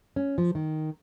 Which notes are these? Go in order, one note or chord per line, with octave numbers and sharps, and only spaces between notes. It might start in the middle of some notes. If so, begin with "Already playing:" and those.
C#4
F3
D#3